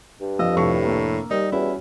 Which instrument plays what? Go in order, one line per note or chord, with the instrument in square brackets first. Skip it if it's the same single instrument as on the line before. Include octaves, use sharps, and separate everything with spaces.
[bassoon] G2
[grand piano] F2 F5 E6 [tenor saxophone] D#5
[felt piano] F1 D4 C#6 [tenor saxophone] A2
[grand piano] A#3
[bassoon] D#2 [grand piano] G3 [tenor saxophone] D#4
[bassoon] E2 [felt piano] C#4 F#4 [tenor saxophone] E4